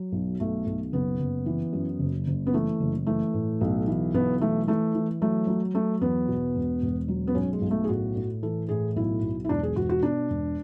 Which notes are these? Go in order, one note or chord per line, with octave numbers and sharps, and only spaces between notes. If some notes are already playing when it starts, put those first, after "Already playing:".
Already playing: F#3
B1
B1 A3
B1
F#1 B3
F#1
E3
F#2
F#1
F#1
B3
E3 A3
F#1
E3 A3
A2
B1
E3
B1 B3
E3 A3
E3 A3
E3
F#3 A3
F#3
F#3 A3
E2 B3
B2
E1
E1
F#3
B3
B1 C#4
G#3
B1
A3
G#4
A2 F#4
A2
E3 A4
A2 G#4
B1 E4
B1
E4
E1 D4
G#4
E1 F#4
F#4
B2 D4
E1